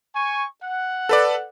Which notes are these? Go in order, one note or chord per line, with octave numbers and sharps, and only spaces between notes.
G#5 C#6
F#5
A4 B4 D5